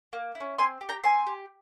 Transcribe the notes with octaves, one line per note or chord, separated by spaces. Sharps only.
A#3
E4
C#4
C4 G#5 C6
G4
G5 A#5
C4 G#5 C6
G4